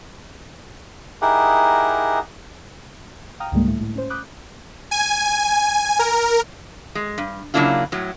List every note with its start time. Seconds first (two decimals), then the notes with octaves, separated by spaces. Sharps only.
1.22 D#4 E4 G4 G#4 A#4 F#5
3.40 F5 G5 A#5 D#6 F6
3.52 C#2 G#2 D3 G3 G#3 A#3
3.67 A2 A3
3.81 A2
3.95 C#4 C5
4.10 B5 D6 D#6 F#6 G6
4.91 G#5
5.99 A#4
6.95 G#3
7.18 G2
7.54 C#3 F#3 A#3 D4 E4 F4
7.92 A2 F#3